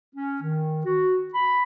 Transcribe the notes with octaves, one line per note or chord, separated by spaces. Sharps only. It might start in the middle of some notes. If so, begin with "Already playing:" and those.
C#4
D#3
F#4
B5